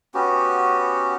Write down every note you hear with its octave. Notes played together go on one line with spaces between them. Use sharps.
B3 C#4 F#4 G4